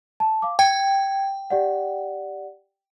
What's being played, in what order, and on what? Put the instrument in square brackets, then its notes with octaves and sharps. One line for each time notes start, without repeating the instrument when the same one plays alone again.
[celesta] A5
F5 D6
[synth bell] G5 [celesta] G#6 C#7
[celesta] G4 D5 F#5